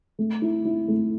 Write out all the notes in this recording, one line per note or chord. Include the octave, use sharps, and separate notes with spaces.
A3
E4
E4
A3